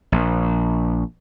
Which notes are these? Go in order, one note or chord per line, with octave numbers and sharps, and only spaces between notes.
A#1